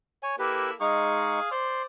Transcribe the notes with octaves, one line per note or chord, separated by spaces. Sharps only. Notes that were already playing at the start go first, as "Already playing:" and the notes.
C#5 G#5
A#3 E4 G4 A4 B4
G#3 D#4 G#4 F5 C#6
C5 D5 C6